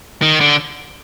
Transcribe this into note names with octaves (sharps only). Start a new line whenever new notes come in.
D#3
D3